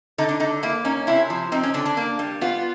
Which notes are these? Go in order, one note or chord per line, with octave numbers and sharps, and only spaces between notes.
D3 D#4
D4
D3 D#4
A#3 E4
C#4 D#4
C3 E4
F3
C4 D#4
C#4
D3 D4
D4
A#3
G3
B3 F4